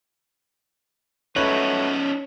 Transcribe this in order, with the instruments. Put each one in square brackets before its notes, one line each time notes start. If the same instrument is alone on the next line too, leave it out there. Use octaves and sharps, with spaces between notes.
[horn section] F#3 A3 B4 [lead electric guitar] C#4 D#4 [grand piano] C#5 F#7